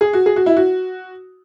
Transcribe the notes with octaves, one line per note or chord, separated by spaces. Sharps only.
G#4
F#4
G#4
F#4
E4
F#4